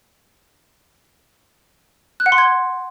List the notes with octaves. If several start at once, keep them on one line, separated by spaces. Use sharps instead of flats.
F#6
F#5
C6
G#6